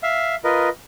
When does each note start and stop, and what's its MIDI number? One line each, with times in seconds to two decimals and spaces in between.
0.03 0.35 76
0.03 0.35 77
0.44 0.69 65
0.44 0.69 70
0.44 0.69 71
0.44 0.69 75